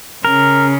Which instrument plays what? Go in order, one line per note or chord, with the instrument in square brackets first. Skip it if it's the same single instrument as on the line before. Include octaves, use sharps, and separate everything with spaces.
[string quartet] C#3 [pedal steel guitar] A#4